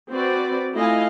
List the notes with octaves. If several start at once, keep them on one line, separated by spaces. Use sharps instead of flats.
C4 F#4 B4 D5
A3 E4 F4 D#5 F5 G#5